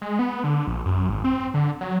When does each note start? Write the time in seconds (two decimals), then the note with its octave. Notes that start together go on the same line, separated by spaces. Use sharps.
0.01 G#3
0.19 B3
0.44 D3
0.67 A#1
0.86 F#2
1.09 G#1
1.24 C4
1.54 D3
1.81 F#3